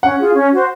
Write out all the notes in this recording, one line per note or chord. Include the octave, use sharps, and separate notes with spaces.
C#4 F#5
F4 G#4
C#4
F#4 C5